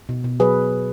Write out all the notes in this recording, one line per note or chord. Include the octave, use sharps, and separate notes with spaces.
B2
B2
F#3 G#4 B4